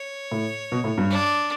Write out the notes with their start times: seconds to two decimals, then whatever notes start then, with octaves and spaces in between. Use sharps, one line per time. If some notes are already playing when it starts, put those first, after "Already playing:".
Already playing: C#5
0.31 A2
0.72 B2
0.84 A2
0.98 G2
1.10 D4